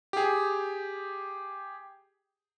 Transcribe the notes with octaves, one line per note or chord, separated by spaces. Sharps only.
G4 G#4